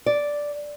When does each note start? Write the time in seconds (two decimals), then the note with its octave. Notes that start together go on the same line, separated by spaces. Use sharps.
0.06 D5